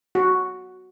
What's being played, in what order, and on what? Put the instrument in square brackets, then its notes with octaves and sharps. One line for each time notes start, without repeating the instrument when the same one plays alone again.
[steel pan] F#4